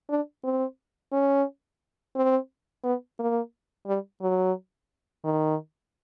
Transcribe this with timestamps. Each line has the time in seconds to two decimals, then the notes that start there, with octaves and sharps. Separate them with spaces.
0.10 D4
0.44 C4
1.12 C#4
2.16 C4
2.84 B3
3.19 A#3
3.87 G3
4.22 F#3
5.24 D#3